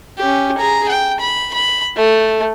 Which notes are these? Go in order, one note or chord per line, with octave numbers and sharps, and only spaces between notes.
C#4 G4
G#4 A#5
G5
B5
B5
A3